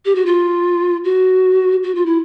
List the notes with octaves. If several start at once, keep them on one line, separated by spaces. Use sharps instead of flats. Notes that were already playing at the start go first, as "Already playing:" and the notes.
G4
F#4
F4
F#4
F#4
F4
E4